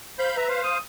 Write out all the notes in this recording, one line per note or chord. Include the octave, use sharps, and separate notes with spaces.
C5 F5 B5 G6
B4 E5 A#5
C5 F5
D#6